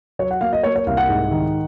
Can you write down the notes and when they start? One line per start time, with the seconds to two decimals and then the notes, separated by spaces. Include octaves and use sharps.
0.19 F#3 C#5
0.31 F#5
0.41 A#3 F5
0.53 D#5
0.63 A#3 C#5
0.76 C#5
0.86 C2 F5
0.97 F#5
1.09 G#2
1.31 D#3